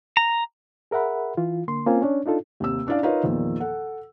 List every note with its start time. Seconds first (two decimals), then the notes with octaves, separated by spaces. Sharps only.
0.17 A#5
0.91 G#4 A#4 E5 F#5 B5
1.37 E3 F4
1.68 D3 A#3 C6
1.86 A#3 C4 C#4 F4 C5 G#5
2.02 C#4 D4 C#5
2.26 D4 D#4 F4 A4
2.60 D#2 C3 E6
2.87 C#4 D4 E4 D5 F5
3.03 D#4 F4 A#4 B4 C#5 F5
3.23 E2 A#2 D#3 F3
3.60 A4 F#5